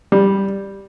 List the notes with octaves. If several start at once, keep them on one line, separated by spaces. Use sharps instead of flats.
G3